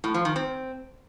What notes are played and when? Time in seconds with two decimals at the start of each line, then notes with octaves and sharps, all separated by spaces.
0.04 A2
0.14 F3
0.25 D#3
0.36 C4